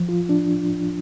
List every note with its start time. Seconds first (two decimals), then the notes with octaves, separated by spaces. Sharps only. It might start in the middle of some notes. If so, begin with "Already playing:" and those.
Already playing: F3
0.09 F4
0.29 D4